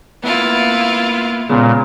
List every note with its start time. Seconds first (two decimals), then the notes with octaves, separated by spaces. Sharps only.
0.24 A#3 B3 E4 F4
1.49 A#2 C#3 G#3 B3